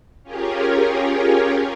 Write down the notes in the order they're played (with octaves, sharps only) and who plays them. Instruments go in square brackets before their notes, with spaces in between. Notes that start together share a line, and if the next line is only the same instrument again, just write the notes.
[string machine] C#4 F4 G4 G#4 A#4 C#5